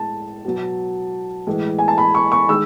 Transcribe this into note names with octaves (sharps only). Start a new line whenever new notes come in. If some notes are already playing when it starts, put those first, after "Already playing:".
Already playing: A2 G#3 A5
B2 F#3
A2 E3 G#3
G#5
A5
B5
C#6
C#6
D#3 G#3 E6